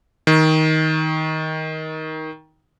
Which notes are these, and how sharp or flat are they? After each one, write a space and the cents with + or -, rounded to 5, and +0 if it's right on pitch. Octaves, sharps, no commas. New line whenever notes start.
D#3 +15